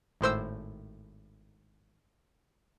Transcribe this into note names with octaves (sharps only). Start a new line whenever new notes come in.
G#1 A2 C5 E6